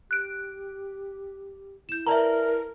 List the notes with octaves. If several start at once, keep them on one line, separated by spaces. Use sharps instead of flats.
G4 F#6 D7
E4 G6 E7
A#4 B4 D5 E5 A5 A#5